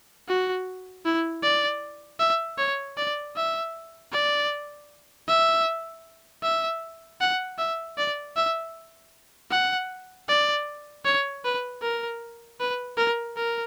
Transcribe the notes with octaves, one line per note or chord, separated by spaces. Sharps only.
F#4
E4
D5
E5
C#5
D5
E5
D5
E5
E5
F#5
E5
D5
E5
F#5
D5
C#5
B4
A#4
B4
A#4
A#4